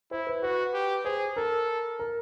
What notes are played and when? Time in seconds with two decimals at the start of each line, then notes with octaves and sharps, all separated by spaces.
0.11 E4 C5
0.27 B4
0.43 F#4 B4
0.73 G4
1.04 G#4 C5
1.36 A4 A#4
1.99 A#4